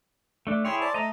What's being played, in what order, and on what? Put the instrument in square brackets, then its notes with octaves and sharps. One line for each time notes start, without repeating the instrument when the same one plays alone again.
[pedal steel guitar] A3 D4
[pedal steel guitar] E4 G#4 C#5 [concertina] G5 C6
[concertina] C5 D5 A5
[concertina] A3 [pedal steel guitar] D#5 A#5